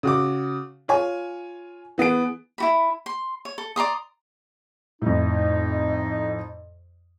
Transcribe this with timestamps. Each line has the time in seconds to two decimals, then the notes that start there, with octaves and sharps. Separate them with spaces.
0.03 C#3 F#4 D6
0.88 F4 C#5 G#5
1.98 E3 B3 G#4 D7
2.58 E4 F#4 B5
3.06 C6
3.45 C#5
3.58 A4
3.76 D5 A#5 C6 D#6
5.02 F2 A2 D#4